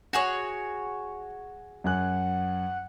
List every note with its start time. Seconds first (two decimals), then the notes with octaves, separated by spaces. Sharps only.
0.13 F#4 G#4 C#5 A#6 E7
1.84 F#2 F#5 G#5 F#6